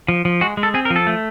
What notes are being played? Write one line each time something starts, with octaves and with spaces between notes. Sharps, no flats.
F3
F3
G#3 F#4
G#3
A4
C4 G#4
A#4
F3
A4
A3